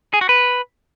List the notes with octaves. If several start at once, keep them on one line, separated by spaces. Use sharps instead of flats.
G#4
F#4
B4